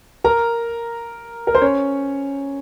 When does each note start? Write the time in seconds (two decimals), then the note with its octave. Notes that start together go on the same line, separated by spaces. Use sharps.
0.24 A#4 A#5
1.47 A#4
1.55 C5
1.61 C#4 C#5